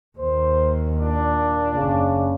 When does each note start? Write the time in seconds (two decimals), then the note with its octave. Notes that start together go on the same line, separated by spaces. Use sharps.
0.18 D#2 C5
1.00 A#2 D4
1.75 F#1 C#3